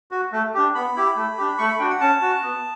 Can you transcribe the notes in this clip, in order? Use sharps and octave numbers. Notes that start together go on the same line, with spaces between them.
F#4
A3
D4 G4
B3 B5
E4 G4
A3
D4 G4
A3 C#6
B5
D4 F#4 G5
F#5
C#4 A5
F#4
B3